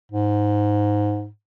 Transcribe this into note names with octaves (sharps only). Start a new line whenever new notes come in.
G#2